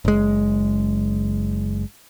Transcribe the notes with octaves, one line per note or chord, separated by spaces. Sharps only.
F#1 G#3